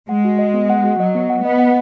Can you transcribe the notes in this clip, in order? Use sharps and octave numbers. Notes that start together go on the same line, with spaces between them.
G#3 F#5
F#4
D#5
B3
F#5
F#4
F#3 D#5
B3
F#5
B3 D#5
F#5